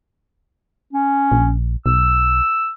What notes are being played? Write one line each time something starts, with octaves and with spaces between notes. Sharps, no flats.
C#4
A#1
B1 E6